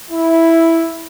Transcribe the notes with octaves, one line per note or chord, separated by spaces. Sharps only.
E4